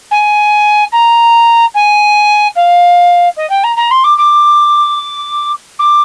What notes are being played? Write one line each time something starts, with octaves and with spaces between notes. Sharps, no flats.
G#5
A#5
G#5
F5
D#5
G5
A#5
A#5
C6
D6
D6
D6